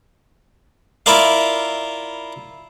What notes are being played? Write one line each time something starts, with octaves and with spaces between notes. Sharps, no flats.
E4 F4 A#4 D5 F5